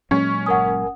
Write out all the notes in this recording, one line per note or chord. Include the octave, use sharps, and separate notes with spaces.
A#2 F#3 G#3 C#4
G1 A#4 F#5 G#5 D#6